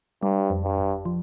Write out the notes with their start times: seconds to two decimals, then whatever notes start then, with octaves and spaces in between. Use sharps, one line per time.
0.23 G2 G3
0.50 F2
0.64 G2
0.78 G1
1.05 F3